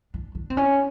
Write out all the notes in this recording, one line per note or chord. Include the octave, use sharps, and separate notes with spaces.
D4
D4
C4
C#4